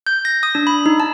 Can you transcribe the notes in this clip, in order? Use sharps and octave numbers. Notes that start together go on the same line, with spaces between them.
G6
A#6
D#6
D4
B5
D#4
A5